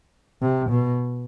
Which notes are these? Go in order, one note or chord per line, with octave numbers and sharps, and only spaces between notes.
C3
B2